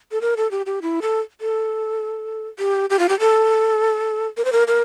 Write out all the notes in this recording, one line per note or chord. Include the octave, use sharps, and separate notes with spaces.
A4
A#4
A4
G4
G4
E4
A4
A4
G4
G4
F4
G4
A4
A#4
C5
A#4
A#4